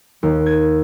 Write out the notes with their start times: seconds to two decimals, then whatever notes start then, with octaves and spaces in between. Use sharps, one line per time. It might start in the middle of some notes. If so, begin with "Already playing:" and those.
0.23 D#2
0.46 G#6